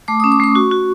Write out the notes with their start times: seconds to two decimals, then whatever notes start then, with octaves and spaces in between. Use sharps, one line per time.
0.08 A3 D6
0.20 C#4 D#6
0.32 D6
0.40 A3 C#6
0.55 F#4
0.71 F#4